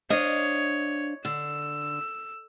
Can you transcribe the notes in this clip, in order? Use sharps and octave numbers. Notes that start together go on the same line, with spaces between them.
D4 C5 C#5 D#5 F5
D3 E6